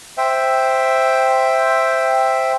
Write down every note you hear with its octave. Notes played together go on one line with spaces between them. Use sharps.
C5 E5 G5